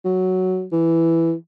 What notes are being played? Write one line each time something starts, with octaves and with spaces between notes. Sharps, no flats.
F#3
E3